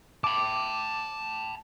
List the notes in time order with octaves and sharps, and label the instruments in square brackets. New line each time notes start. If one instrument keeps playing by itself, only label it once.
[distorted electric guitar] A5 B5 [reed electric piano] D6